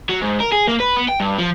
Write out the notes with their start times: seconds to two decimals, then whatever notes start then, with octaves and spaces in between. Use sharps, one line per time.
0.09 F#3
0.21 G#2
0.40 A#4
0.52 G#4
0.68 A#3
0.80 B4
0.97 B3
1.08 G5
1.20 G2
1.39 F3